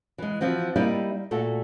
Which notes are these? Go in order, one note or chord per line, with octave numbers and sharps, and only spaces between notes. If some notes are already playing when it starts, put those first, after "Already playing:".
E3 G#3
E3 F3 C4 F#4
G3 A#3 D#4 E4 G4 D5
A#2 A3 F#4 A4